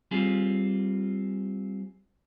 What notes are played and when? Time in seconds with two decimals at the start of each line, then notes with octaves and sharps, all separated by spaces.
0.11 G3 C4 F4 G#4